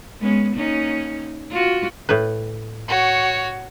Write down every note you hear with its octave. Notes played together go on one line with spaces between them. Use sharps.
G#3 B3 C#4
A#3 C#4 D#4
F4 F#4
A2 B4
F#4 C#5